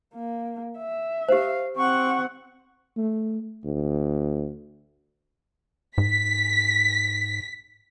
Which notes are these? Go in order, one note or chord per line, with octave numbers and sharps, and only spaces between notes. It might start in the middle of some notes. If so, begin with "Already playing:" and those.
A#3
E5
G4 C5 F5
C4 F#5 C#6
A3
D2
G#2 B6